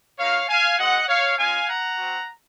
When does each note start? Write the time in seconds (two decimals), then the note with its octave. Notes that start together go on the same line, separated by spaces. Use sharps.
0.18 A#3 D#4 F#4 C#5 F5
0.48 F5 G#5
0.78 G#3 C4 F#4 D#5 F#5
1.07 C#5 F5
1.37 G#3 C#4 F4 F5 G#5
1.67 F#5 A#5
1.97 C4 F#4